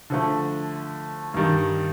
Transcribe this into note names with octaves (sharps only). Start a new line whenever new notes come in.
D3 F3 A3
G2 D#3 G3